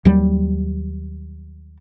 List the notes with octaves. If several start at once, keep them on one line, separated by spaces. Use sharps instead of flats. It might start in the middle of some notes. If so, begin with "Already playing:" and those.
D#2 F#3 G3